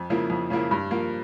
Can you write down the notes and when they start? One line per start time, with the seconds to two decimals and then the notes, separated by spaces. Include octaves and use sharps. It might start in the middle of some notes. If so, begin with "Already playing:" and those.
Already playing: F2
0.10 C#3 F3 A#3 E4
0.30 F2
0.50 C#3 F3 A#3 E4
0.71 G2
0.91 F3 A#3